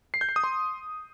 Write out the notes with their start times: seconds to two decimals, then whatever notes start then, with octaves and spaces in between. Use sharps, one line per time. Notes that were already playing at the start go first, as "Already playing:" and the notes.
0.14 C7
0.21 G6
0.29 C7
0.36 D#6
0.44 C6